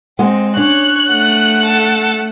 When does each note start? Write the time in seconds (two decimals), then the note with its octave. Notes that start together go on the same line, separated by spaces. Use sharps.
0.19 G#3 C4 F#5
0.57 C#4 D4 C#5 F#6
1.11 A3 F#5
1.65 A4 A5